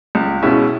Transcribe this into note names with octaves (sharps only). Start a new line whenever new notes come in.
C#2
B2 G#3 C#4 E4